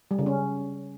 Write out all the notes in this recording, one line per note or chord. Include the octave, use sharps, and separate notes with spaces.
G3
C#3
C#4